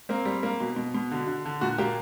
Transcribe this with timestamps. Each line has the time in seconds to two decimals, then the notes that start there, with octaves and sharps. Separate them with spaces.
0.09 A#3 C4
0.25 G3
0.43 A#3
0.60 B2
0.76 B2
0.94 B2
1.11 D3
1.28 D3
1.46 D3
1.61 A#2 F#4
1.78 A#3 G4